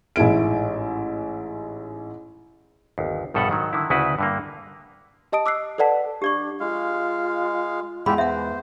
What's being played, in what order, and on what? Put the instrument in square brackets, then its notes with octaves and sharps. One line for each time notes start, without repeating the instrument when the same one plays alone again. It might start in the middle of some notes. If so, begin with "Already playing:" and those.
[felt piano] A1 G#2 E4 D7
[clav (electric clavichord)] G1 D#2
A#1 G2 B2 A4 E5 F#5
G#2 D#3 F#3
D3 D#3 E4
D2 C#3 E4 F#4 B4
G2 D3 A#3
[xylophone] G4 D#5 A5 D#6 D7
D6 E6 F#6 C7
A4 B4 D5 F#5 A5 B6
[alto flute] D4 [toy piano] G4 D5 C#6
[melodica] G#3 F5 [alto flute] F4
[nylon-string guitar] E2 G#3 D#4 [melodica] F4 G4 E5 [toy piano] B5
[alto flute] B3 [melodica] C5 [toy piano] E5 F#5